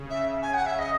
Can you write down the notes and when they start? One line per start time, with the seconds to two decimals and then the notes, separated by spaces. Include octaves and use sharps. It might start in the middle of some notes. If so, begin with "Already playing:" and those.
Already playing: C#3
0.09 E5
0.42 G#5
0.53 F#5
0.66 E5
0.78 D#5